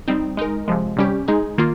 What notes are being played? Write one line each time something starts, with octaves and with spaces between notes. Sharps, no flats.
G3 C4 D#4
G#3 D#4 A#4
C3 F3 G#3
C3 G3 C#4 G4
G#3 D#4 G#4
D#3 A#3 F4